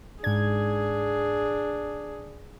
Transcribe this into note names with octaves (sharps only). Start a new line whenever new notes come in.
G#2 D4 G#4 G#6